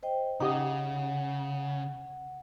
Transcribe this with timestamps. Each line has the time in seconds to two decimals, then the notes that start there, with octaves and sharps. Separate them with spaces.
0.03 C5 D#5 G5
0.40 C#3 D#4 G4 D#5 F#5